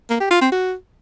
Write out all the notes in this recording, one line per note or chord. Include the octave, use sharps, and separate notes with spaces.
A#3
G4
F4
C4
F#4